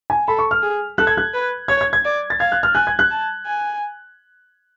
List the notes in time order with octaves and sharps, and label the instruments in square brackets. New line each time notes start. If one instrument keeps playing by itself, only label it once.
[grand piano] G#5
[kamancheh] A4 [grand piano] B5
[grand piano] C#6
F6
[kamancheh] G#4
[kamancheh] A4 [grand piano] F#6
[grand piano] G#6
F#6
[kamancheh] B4
[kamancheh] C#5 [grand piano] G#6
[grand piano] G#6
G#6
[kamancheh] D5
[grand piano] A6
[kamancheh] F5 [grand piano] G#6
[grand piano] F#6
F6
[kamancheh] G#5 [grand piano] F#6
[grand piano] G#6
F#6
[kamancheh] A5
G#5